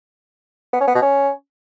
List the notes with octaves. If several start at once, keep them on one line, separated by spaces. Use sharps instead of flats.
B3
C#4
B3
B2
C#4